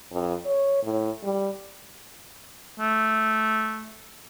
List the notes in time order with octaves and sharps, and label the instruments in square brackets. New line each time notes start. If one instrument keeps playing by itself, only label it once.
[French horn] F2
C#5
A2
G3
[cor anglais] A3